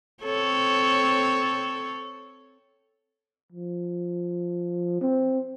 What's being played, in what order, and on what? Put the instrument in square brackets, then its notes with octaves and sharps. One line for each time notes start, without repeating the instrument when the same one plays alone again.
[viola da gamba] C4 A4 C#5
[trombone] F3
C4